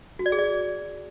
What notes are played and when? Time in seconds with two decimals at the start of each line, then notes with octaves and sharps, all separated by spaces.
0.19 F#4
0.26 D5
0.32 G#4
0.39 D5